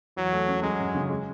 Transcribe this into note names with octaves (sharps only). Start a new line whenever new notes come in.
E2 F#3
A3
C#4
F#3 G#3
F#2
C#3
G#3